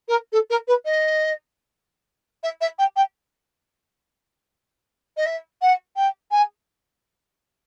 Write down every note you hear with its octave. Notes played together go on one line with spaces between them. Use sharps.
A#4
A4
A#4
B4
D#5
E5
E5
G5
G5
D#5
E5
F#5
G5
G#5